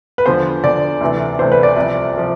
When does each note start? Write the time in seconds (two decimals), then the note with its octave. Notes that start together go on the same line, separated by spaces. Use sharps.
0.18 B4
0.26 E2 D3 F3 C5
0.64 E2 D3 F3 D5
1.01 D2 C3 E3
1.39 D2 C3 E3 C5
1.52 B4
1.63 D5
1.76 C2 C3 F3
2.15 C3 F3